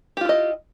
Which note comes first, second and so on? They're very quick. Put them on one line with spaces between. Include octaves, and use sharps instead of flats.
G4 F4 E4 D#5